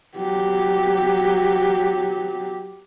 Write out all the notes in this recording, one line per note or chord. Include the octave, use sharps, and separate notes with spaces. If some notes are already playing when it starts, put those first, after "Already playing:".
F#3 G4